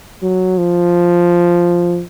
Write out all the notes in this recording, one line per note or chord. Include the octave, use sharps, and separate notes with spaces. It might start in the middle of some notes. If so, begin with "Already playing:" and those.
F#3
F3